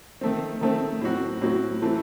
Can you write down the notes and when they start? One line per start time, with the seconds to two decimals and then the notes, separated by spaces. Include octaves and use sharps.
0.21 D#3 A3 C4
0.61 D#3 A3 C4
1.01 A2 F#3 C4 F#4
1.41 A2 F#3 C4 F#4
1.82 E3 A3 C4